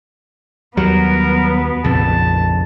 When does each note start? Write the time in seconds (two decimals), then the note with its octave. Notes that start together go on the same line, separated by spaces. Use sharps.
0.77 D#2 F#3 G3 B3 A#4
1.84 A#1 F2 C#3 A5